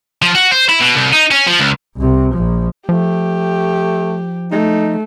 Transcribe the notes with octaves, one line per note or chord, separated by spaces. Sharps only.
F3
F#4
C5
E4
B2
C2
D#4
C#4
F3
C#2
C2 C3
A#1 F3
F3 A3 G4
A3 D#4